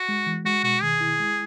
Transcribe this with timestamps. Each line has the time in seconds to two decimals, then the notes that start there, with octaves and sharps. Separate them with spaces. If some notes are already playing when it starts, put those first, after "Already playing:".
Already playing: F#4
0.09 G#3
0.26 E3
0.45 G#3 F#4
0.63 B2 F#4
0.82 D#3 G#4
1.00 E4
1.20 G#3